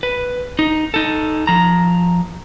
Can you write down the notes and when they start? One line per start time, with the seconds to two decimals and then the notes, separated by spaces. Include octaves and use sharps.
0.03 B4
0.59 D#4
0.94 D#4 A4
1.47 F3 A#5